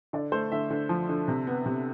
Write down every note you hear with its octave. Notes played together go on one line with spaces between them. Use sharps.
D3 D5
A3 C5
D3 E5
D3
F3
D3
C3
B3
C3